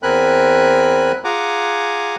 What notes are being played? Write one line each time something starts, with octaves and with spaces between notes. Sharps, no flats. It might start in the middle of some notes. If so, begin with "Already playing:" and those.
E2 C4 A#4 G#5 B5 F#6
F4 G#4 F#5 G#5 A#5 D6